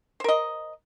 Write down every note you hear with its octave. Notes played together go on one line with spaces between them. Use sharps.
A#4 C5 D#5